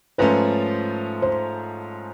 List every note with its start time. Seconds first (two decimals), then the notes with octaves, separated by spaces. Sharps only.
0.18 G#2 F3 A3 C#4 B4
1.22 C5